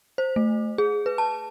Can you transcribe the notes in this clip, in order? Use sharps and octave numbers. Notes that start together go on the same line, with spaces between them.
C5
A3
G#4
B4
A5